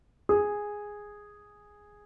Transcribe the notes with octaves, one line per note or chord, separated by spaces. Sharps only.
G#4